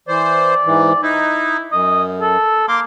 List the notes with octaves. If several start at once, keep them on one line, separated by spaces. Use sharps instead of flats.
E3 C5 D5
G#2 E3
D#4 E4
F#2 D#5
A4
A#3 C6 D6